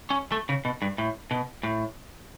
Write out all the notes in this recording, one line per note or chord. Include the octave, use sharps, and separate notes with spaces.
C#4
A3
C#3
B2
G2
A2
B2
A2